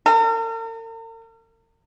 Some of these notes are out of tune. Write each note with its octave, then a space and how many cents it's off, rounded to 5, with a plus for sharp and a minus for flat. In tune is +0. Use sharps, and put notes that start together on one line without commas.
A#4 -45